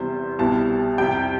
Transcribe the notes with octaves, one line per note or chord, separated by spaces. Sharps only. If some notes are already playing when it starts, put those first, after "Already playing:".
Already playing: E2 C3 G3 C5
C2 B2 G3 A5
F2 C3 G3 G5